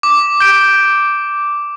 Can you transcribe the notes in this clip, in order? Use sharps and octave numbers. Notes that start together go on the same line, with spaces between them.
D6
G6 D7